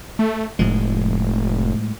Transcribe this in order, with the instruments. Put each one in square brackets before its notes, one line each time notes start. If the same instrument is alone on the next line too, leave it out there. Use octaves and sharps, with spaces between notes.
[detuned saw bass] A3
[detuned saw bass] F1 [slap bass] A2 F3 G#3